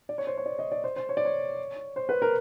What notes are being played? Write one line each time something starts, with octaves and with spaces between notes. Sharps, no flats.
D5
C#5
C5
C#5
D5
D#5
D5
C5
C5
C#5
D5
C#5
C5
B4
A#4